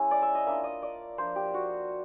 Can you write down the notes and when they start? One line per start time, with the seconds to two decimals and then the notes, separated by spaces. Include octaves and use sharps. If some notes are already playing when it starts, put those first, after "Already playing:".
Already playing: G#3 C#4 E4
0.11 D5
0.22 E5
0.35 D#5
0.46 A#3 D4 F4 E5
0.64 D#5
0.82 D5
1.18 F3 A#3 D4 C5
1.36 G4
1.54 F#4